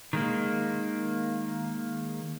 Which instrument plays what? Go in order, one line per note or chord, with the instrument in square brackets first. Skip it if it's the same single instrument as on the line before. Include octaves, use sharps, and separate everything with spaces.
[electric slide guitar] D#3 G#3 A#3